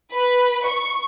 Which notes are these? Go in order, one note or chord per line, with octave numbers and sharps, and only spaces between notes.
B4
C#6